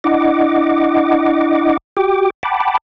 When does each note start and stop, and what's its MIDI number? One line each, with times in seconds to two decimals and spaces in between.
0.04 1.77 62
0.04 1.77 64
0.04 1.77 75
0.04 1.77 78
0.04 1.77 86
1.97 2.30 66
1.97 2.30 67
1.97 2.30 79
1.97 2.30 86
2.43 2.78 78
2.43 2.78 79
2.43 2.78 81
2.43 2.78 83
2.43 2.78 86